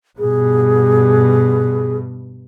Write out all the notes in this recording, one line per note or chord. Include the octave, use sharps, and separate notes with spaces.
G2 B2 G#4